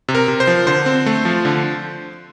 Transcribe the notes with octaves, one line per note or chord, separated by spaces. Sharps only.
C3
A#4
C3
C5
F3
D3 C5
C4
A3
F3
D3